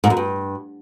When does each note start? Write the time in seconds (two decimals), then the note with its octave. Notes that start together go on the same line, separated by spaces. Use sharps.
0.04 G#2
0.10 F#2
0.17 G2